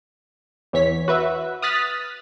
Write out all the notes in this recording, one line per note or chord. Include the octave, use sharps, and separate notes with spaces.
E2 E3 C#5 B6
F#4 B4 E5
D#6 F6 F#6 A6 B6